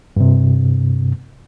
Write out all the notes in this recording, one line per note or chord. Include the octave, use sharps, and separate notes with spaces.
G2 C3